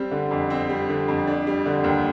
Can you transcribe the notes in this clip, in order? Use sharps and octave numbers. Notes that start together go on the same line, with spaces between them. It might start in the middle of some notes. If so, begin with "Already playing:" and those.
Already playing: G3 C4
D3
F2
C4
G3
D3
F2
D4
G3
D3
D#2